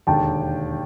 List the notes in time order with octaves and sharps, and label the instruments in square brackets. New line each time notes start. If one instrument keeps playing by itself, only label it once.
[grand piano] E1 D#2 D3 [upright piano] G5 A5